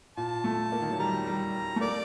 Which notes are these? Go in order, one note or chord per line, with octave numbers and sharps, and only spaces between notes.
A#2 A5
A3
A#3
D#3
F#3
G3 A#5
G3
A3
A#3 D5